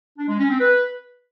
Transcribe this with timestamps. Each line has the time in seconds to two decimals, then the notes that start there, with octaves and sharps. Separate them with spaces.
0.18 D4
0.28 G#3
0.39 C#4
0.49 C4
0.60 B4